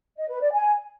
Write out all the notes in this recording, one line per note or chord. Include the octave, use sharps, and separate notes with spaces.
D#5
B4
D5
G#5